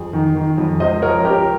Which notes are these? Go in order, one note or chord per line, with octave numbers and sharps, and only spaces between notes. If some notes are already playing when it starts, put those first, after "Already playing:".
Already playing: F2 G#4
D#3
D#3
F2
C#2 C5 D#5
F3 A#4 C#5
C#2 G4 A#4